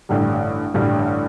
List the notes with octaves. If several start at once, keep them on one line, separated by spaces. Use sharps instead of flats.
A1 G2 D3 G3
A1 G2 D3 G3